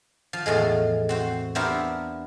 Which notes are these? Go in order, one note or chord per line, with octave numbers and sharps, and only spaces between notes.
F3
E2 A2 F3 G#3
C4 F#4 C5
B3 D4 E4 G4 A#4 C5